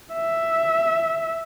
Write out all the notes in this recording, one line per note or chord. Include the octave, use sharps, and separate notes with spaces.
E5